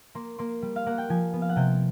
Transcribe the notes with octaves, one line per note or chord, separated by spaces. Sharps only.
A#3 C6
A#3 C6
G3
F5
A#3 F#5
G5
F3 G#5
B3
F5
F#5
C3 G5